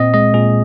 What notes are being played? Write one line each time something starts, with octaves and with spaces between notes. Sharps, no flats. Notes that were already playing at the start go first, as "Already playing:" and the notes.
Already playing: A#2 C4 D#5
G#3 D#5
A#2 G#4